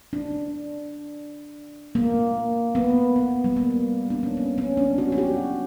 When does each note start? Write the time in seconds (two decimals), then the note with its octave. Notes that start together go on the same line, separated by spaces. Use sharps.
0.13 D4
1.95 A#3
2.75 B3
3.16 B3
3.44 G3
3.57 A#3
4.10 D4
4.23 C#4
4.37 B3
4.58 C#4
4.77 D4
4.98 F#4
5.12 F#4
5.18 G4